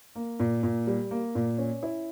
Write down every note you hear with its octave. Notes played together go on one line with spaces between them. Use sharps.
A#3
A#2
A#2
G3
A#3
A#2
C#4
E4